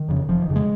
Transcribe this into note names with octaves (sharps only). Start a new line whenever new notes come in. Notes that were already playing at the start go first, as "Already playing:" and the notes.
Already playing: D#3
F2 C#3
F1 F3
D#3
F2 C#3
G#3